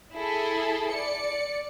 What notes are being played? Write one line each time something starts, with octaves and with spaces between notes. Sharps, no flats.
E4 G#4 A4
D5 C#7